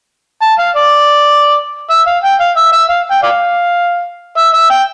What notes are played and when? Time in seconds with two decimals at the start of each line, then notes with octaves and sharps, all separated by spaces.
0.42 A5
0.59 F5
0.75 D5
1.90 E5
2.06 F5
2.24 G5
2.40 F5
2.56 E5
2.72 E5
2.89 F5
3.11 G5
3.22 D5 F5
4.37 E5
4.54 E5
4.70 G5